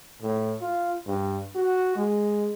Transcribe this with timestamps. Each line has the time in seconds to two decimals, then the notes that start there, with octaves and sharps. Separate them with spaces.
0.22 A2
0.61 F4
1.06 G2
1.55 F#4
1.96 G#3